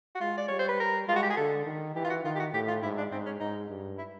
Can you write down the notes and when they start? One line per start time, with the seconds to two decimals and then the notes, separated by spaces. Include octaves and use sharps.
0.15 F#4
0.21 G#3 F4
0.38 D5
0.48 G3 C#5
0.59 C5
0.68 B4
0.80 A#4
1.08 G#3 F4
1.16 F#4
1.23 G4
1.30 G#4
1.37 D3 A4
1.66 D#3
1.96 E3 G4
2.04 F4
2.10 F#4
2.24 D#3 F4
2.35 G4
2.40 F#4
2.53 A2 G4
2.68 F4
2.83 G#2 E4
2.98 D4
3.12 G#2 C4
3.26 C#4
3.40 G#2 D#4
3.70 G2
3.98 E4